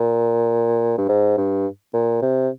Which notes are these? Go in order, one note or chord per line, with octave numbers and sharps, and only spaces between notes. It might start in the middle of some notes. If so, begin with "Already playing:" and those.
Already playing: A#2
G2
G#2
G2
A#2
C3